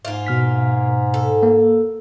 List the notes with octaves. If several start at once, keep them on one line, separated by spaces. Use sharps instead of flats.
G#2 A#3 F4
B2 F6 B6
A4
A#3